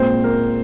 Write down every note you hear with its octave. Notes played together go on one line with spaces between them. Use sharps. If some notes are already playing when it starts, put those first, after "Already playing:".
Already playing: A#2 G#3 C4 C5
A#4